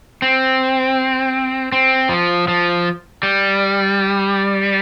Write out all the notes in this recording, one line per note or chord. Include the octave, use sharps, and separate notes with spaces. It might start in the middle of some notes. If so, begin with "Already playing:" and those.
C4
C4
F3
F3
G3